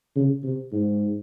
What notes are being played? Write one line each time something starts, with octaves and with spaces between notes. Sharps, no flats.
C#3
C3
G#2